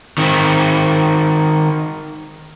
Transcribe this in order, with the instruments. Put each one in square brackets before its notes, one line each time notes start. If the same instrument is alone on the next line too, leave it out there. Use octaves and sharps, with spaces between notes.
[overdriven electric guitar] D#3 C4